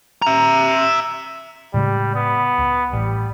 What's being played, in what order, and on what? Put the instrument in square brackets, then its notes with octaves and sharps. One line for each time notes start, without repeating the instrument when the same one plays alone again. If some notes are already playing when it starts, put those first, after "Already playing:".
[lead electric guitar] E5 A#5
[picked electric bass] A2 C#3 G#3 [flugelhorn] G3
[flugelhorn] B3
[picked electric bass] C#2
[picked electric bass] A1 [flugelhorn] G3